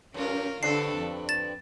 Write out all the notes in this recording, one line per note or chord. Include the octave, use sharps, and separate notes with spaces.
F#2 C#4 F4 A#4
G2 D3 C4 D4 A4 C7
F2
A6 E7